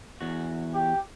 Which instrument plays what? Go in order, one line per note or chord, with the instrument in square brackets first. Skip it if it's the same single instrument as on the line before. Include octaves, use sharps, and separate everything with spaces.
[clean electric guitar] E2 F#4
[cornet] G4